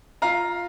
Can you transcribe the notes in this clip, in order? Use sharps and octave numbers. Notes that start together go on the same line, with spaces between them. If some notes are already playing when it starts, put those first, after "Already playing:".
F4 F5 A#5